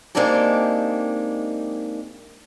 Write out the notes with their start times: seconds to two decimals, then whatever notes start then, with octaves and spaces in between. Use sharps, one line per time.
0.15 G#3 A#3 C4 D4 D#4 G4